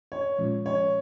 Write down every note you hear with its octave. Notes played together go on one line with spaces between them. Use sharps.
C#5
A#2 F3 G#3 C#4 F4
C#5